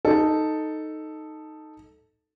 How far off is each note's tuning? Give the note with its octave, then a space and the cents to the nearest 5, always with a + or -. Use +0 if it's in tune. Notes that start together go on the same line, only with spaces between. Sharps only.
D#4 +0 A4 +0